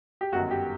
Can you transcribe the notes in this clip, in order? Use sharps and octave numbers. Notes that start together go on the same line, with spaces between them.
G4
G1 F#2 D#3 F#4
G4